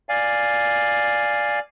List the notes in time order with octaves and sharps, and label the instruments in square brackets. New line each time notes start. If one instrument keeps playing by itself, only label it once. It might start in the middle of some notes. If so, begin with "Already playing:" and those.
[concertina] D5 F5 G#5